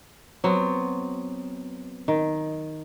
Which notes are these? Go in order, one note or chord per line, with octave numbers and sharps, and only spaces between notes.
F#3 B3 C4
D#3